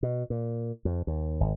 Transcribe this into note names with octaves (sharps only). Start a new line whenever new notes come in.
B2
A#2
F2
D#2
G#1